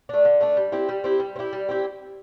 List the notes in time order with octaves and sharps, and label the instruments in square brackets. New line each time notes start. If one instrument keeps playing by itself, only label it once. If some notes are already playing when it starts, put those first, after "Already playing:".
[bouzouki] A3 D4
D3
A3 D4
G3
C4 E4 G4
G3
C4 E4 G4
G3
C4
E4 G4
G3
C4 E4 G4